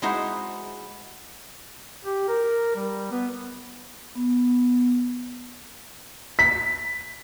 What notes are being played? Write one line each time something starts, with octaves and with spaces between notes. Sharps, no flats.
G#3 D#4 E4 F#4 C5
G4
A#4
G3
B3
B3
B6